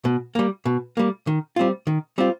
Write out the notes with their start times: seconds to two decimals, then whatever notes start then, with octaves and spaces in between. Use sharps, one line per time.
0.05 B2
0.35 G3 A#3
0.66 B2
0.97 G3 A#3
1.27 D#3
1.56 G3 C4 F4
1.87 D#3
2.18 G3 C4 F4